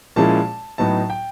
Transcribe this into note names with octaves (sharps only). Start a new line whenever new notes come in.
A#2 F3 G#3 C#4 E4 A5
A2 F#3 B3 D#4 A5
G5